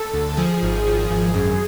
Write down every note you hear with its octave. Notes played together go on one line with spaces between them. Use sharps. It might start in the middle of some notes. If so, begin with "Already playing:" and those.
Already playing: A4
D2
F3 G#4
G#1
F3
G#1
F#2